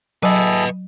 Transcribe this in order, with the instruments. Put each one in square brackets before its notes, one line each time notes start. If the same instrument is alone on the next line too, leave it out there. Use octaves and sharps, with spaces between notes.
[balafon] F#3 [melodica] E4 G#4 A4 [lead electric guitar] B4 D#5